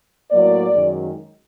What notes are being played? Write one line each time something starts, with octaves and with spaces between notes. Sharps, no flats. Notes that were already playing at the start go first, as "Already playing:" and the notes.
A2 F#3 A#3 D5
F#2 D#3 G#3